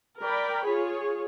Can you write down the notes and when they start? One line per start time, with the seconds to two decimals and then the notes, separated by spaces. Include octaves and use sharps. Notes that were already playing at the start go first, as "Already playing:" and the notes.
0.22 A#4 D5 G5 B5
0.64 F4 G#4 C#5